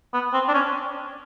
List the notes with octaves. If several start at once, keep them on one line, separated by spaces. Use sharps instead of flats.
B3
C4
D4
C#4